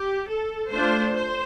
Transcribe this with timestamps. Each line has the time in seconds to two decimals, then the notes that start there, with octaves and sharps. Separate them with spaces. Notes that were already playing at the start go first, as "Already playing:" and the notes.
Already playing: G4
0.30 A4
0.72 A3 D4 F4 C5
1.14 C5